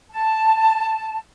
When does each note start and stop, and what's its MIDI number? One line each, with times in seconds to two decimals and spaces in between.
0.11 1.18 81